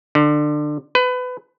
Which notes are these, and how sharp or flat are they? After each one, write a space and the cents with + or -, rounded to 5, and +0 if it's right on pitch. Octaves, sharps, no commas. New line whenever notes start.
D3 +25
B4 +25